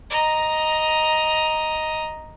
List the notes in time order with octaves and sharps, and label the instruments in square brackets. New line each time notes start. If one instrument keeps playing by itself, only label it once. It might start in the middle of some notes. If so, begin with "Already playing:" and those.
[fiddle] D#5 A#5